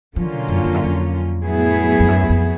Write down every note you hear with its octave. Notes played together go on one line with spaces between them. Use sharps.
D3 F3 F#3 A#3 C#4 F4
B2
F#2
F2
F#2
F2
A2 F#3 B3 E4 G#4
F2
F#2
E2
F2